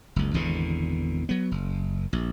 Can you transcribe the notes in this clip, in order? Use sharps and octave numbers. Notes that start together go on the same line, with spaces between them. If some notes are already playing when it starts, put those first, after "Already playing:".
F#1 C#2
G#1 E2 B2 D3
F#3 B3
F#1
A#1